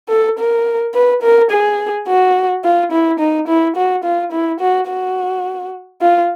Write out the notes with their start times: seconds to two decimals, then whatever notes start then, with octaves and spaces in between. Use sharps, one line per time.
0.09 A4
0.39 A#4
0.94 B4
1.22 A#4
1.50 G#4
2.08 F#4
2.64 F4
2.92 E4
3.20 D#4
3.47 E4
3.76 F#4
4.04 F4
4.32 E4
4.60 F#4
4.88 F#4
6.01 F4